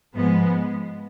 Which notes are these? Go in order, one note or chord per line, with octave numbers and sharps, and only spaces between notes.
G#2 F3 G#3 B3